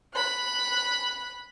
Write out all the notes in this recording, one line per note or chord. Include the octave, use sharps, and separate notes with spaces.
B5 F#6